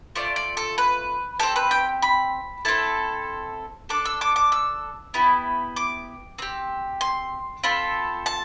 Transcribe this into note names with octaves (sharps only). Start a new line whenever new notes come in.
A3 C4 F4 D5
D5
A4
B4
C4 G4 A4
B4
G5
B5
C4 E4 A4 A5
D4 A4 D6
E6
D6
D6
E6
B3 E4 G4
D6
C4 G4
C6
C4 F4 A4 B5
A5